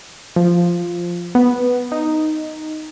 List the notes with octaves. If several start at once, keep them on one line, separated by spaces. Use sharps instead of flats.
F3
B3
D#4